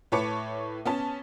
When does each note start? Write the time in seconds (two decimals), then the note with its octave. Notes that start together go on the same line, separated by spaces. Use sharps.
0.12 A2 B4 C#5 A5 D6 C#7
0.85 B3 C#4 A5